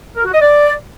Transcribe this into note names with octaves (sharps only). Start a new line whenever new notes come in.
A#4
F#4
D#5
D5